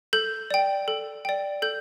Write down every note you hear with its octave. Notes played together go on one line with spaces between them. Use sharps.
A4 G6
D5 G5
A4
D5 G5
A4 G6